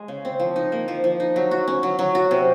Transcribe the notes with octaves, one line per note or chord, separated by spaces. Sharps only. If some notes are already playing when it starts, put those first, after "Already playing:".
Already playing: G#3
C#3
C4
F3
D#4
A#3
F3
F3
D#4
F#3
F#4
C#4
F#3
F#3
F#4
C3